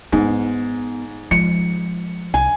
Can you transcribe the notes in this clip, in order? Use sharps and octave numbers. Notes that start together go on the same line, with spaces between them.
G#2 B3
F3 G#3 C#7
C2 G#5